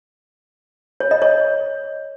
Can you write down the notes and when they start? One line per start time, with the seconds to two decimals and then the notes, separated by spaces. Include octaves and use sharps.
1.00 C#5
1.11 D#5
1.22 C#5